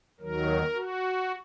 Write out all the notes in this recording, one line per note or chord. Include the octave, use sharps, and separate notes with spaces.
D#2 D#3 F#3 A#4
F#4